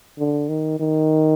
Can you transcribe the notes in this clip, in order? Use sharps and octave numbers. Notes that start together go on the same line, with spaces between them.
D3
D#3
D#3